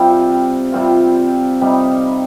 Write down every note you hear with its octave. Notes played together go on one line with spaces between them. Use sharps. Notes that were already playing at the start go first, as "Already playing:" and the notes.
Already playing: C3 G3 C4 F4
C3 G3 C4 F4
C3 G3 C4 D#4